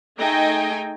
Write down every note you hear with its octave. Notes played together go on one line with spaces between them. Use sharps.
A3 D#4 G#4 D#5 G5 G#5